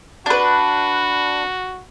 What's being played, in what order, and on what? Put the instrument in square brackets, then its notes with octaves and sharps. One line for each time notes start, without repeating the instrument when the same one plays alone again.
[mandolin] D4 B4 [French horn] F#4